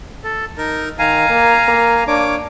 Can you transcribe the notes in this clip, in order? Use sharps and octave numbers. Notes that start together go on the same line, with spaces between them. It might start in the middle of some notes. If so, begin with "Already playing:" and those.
A4
D#4 A#4
D#3 F5 G#5 A#5
A#3
A#3
A#3 D4 C#5 D6